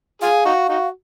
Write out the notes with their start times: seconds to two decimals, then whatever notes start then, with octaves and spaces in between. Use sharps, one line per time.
0.22 F4 G#4 F5
0.45 D#4 F#4
0.69 D#4 F#4